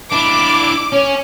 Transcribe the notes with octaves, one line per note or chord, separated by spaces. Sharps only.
D4 E4 D6
C#4 C#5